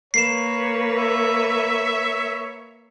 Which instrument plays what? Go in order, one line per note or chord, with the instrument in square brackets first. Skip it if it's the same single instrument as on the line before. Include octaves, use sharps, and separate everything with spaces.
[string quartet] A#3 B4 [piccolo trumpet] C#5 [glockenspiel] C7 E7
[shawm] E5